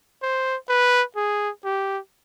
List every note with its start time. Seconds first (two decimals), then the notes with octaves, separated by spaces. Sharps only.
0.22 C5
0.69 B4
1.16 G#4
1.65 G4